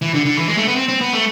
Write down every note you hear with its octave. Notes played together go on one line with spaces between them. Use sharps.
E3
D3
D3
E3
G#3
A3
B3
C4
C4
B3
A3